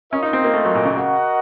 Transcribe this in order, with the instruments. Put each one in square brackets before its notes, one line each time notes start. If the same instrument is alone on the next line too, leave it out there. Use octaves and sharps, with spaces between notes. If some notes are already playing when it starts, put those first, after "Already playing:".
[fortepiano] C#4 [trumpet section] F4 A#4 D#5
[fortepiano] D#4
C4
A#3
A3
F#3
A#2
C#3
[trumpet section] F#4 A#4 D#5 F#5